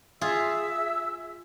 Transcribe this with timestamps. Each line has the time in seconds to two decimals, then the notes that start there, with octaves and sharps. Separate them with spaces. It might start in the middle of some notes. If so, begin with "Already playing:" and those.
0.21 F4 G#4 E5 E6